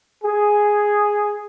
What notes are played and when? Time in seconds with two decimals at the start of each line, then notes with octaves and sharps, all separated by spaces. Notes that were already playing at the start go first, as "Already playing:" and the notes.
0.24 G#4